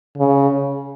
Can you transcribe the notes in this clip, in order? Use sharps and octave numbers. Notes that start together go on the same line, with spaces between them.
C#3